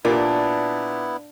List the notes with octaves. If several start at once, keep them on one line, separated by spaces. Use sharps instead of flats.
A#2 B3 D4 E4 G4 A#4